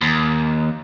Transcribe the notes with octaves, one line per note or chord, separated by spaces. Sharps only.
D#2